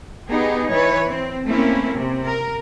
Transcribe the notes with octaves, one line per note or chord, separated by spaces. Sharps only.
B3 D#4 G4 G#4
E3 B4 C#5
C4
A3 A#3 C4 C#4 E4
C3
A#4